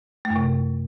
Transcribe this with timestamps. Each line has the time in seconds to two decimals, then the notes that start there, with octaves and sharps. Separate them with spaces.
0.25 A3
0.30 F#2
0.36 C3